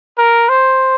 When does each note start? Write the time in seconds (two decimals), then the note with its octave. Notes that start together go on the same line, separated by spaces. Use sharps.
0.18 A#4
0.49 C5